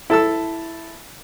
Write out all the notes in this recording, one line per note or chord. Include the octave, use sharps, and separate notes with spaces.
E4 A4 A5 E6